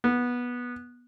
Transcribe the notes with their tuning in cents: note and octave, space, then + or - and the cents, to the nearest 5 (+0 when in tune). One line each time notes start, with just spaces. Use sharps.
B3 -15